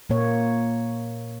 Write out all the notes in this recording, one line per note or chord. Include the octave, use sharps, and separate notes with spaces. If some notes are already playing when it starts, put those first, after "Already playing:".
A#2 A#3 C#5